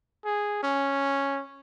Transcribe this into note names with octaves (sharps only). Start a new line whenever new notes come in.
G#4
C#4